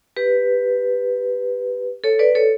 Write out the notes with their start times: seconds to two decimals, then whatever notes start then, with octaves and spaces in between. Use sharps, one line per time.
0.16 G4 B4
2.04 A4 C#5
2.19 B4 D5
2.35 A4 C#5